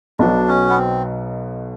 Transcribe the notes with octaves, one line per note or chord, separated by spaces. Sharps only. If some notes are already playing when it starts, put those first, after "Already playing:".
B1 B2 F#3 D4
C#4
B3
C4